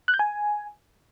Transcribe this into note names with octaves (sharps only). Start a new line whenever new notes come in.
F#6
G6
G#5